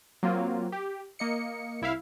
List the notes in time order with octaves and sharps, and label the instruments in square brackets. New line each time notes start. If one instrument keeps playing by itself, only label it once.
[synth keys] F#3 A#3 C4 F4
G4
A#3 D#5 C#7
C2 E4 E5 F5